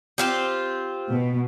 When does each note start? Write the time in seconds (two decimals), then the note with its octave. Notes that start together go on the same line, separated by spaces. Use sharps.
0.18 C4 F4 G4
1.10 B2